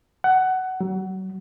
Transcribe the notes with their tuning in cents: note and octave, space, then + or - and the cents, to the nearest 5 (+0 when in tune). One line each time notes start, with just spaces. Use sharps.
F#5 +15
F#3 +35